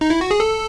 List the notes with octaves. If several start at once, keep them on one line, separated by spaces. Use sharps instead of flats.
D#4
E4
F#4
G#4
A4